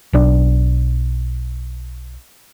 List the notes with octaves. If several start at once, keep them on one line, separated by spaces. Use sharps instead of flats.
B1 D4